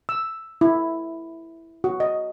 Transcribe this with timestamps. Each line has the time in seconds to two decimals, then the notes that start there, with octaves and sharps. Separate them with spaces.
0.09 E6
0.61 E4
1.84 F#4
2.00 D#5